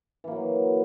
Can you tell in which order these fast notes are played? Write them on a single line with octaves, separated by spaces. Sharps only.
E3 A#3 F#3